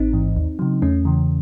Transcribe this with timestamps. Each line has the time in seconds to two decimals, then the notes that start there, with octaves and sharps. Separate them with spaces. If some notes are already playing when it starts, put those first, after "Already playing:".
Already playing: A1 C4 D#4
0.13 G#2 E3
0.36 D#2
0.59 C#3 F#3
0.82 E2 A3 C#4
1.05 C#3 E3